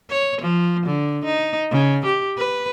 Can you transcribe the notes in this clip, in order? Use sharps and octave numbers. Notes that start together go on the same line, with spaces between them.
C#5
F3
D3
D#4
C#3
G4
B4